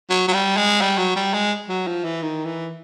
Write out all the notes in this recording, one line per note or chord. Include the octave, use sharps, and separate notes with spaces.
F#3
F#3
G3
G#3
G3
F#3
G3
G#3
F#3
F3
E3
D#3
E3